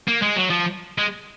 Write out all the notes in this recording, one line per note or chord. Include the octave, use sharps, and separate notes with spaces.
A#3
G#3
F#3
F3
G#3